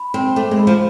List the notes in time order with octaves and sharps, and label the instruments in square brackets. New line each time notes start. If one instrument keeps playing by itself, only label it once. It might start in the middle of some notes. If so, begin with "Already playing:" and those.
Already playing: [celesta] B5
[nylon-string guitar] C4 [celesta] C5
[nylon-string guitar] A3 [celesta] D6
[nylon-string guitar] G#3
[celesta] B5
[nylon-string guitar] F3